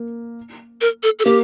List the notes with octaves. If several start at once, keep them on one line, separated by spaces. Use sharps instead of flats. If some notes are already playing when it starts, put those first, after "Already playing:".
Already playing: A#3
A#4
A4
A4
A#3 G4